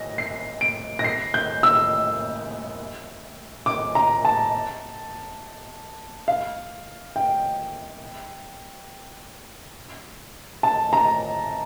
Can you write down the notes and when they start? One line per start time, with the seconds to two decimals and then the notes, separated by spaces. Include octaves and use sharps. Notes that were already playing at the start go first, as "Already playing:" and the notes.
Already playing: A#6
0.18 C7
0.61 D7
0.99 A#6
1.04 C7
1.34 G6
1.63 E6
3.66 D6
3.95 A#5
4.25 A5
6.28 F5
7.16 G5
10.63 A5
10.93 A#5